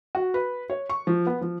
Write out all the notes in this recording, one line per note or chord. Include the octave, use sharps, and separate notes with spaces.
F#4
B4
C#5
C#6
F3
B3
F3